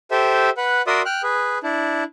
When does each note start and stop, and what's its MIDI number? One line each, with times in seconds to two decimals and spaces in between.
0.11 0.50 67
0.11 0.50 69
0.11 0.50 72
0.11 0.50 76
0.57 0.82 71
0.57 0.82 78
0.87 1.02 66
0.87 1.02 70
0.87 1.02 74
0.87 1.02 76
0.87 1.02 84
0.87 1.02 87
1.06 1.22 79
1.06 1.22 89
1.06 1.22 90
1.23 1.58 68
1.23 1.58 71
1.63 2.04 62
1.63 2.04 64